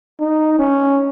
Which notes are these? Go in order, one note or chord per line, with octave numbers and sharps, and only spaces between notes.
D#4
C#4